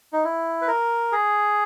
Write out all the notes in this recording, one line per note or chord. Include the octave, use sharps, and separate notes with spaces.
D#4
E4
B4
A#4
G#4